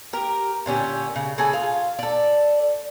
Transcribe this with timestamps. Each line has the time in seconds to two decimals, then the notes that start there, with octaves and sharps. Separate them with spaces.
0.13 G4 A#4
0.66 A#2 D3 C#4 G4
1.16 C#3
1.38 C#3 G#4 A4 G#5
1.53 F4
1.99 A4 D5